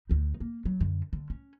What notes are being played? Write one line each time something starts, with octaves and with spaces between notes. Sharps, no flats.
D2 D#4
A#3
F#3
F#2 D3
D3
C#4